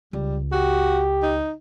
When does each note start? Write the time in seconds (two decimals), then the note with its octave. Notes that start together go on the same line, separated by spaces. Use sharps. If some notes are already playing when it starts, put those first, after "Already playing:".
0.13 C#2 G3
0.52 F#4 G4
1.23 D#4